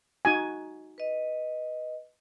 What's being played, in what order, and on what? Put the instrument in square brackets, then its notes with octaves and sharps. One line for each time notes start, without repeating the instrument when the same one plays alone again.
[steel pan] D#4 F#4 G#5
[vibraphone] B4 D#5